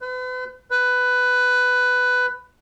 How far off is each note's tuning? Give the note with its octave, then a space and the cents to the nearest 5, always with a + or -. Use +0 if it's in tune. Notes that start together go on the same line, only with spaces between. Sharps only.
B4 +40
B4 +10